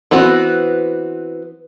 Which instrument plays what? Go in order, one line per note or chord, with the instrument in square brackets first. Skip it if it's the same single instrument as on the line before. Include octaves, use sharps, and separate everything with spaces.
[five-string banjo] E3 B3 C4 F#4